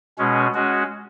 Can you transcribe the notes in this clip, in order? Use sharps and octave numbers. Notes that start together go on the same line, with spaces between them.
B2 G#3 C#4
G#3 C#4 F#4